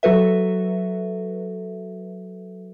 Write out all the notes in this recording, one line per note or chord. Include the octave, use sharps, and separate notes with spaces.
F#3 F#4 A4 B4 E5